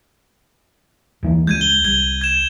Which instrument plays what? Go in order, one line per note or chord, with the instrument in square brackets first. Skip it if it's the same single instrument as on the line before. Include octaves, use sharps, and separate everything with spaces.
[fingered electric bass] D#2 E3 A#3
[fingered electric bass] C#2 G#3 [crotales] G6 G#6 D#7
[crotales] G7
[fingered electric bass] C2 [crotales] G#6 G7
[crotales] G#6 E7